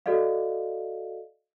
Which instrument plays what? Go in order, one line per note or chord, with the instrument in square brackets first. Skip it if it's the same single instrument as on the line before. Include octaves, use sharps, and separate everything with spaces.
[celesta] F#4 A4 D5 D#5 F5